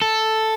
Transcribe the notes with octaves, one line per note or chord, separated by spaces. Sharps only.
A4